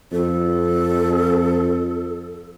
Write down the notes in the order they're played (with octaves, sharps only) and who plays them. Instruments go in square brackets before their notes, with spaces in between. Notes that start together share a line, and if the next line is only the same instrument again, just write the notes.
[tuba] F2 [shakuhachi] A4